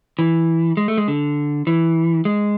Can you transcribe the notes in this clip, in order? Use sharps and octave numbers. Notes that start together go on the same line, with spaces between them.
E3
G#3
A3
G#3
D3
E3
G#3